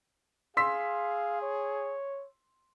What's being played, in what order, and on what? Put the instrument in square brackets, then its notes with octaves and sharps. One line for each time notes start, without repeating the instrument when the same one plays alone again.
[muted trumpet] G#4 [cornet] F5 [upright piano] C6 E6 B6
[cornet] C#5